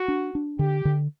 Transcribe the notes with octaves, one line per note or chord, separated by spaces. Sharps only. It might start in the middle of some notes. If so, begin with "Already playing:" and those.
Already playing: F#4
D4
D4
D3 G4
D3